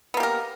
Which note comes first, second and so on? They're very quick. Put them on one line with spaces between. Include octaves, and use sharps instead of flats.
B3 A#3 G4 A#4